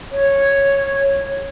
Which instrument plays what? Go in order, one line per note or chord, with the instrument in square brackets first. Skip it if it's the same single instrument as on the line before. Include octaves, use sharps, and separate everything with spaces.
[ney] C#5